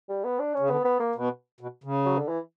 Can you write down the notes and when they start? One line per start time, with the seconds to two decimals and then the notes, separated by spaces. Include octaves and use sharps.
0.09 G3
0.24 B3
0.39 D4
0.54 C#4
0.59 C#3
0.69 D3 B3
0.85 B3
1.00 A#3
1.15 B2
1.60 B2
1.84 C#3
2.05 F#3
2.17 D3
2.28 E3